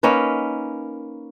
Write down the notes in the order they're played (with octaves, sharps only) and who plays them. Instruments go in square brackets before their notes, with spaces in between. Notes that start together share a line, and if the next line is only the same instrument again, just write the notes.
[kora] A#3 C#4 D#4 B4